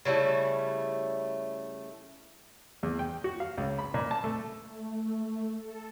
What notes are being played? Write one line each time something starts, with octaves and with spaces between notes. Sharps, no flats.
C#3 G3 A3 E4
E2
G5
F#4
F5
C#2
B5
A#2
A5
A3
A3
A4